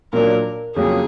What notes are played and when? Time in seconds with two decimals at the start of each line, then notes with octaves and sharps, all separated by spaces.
0.13 A#2 F#3 A#3 D4 A#4
0.76 F2 C#3 F#3 A#3 G#4